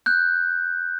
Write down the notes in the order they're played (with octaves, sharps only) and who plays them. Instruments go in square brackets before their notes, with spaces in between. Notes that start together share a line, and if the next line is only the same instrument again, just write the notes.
[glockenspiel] F#6 G6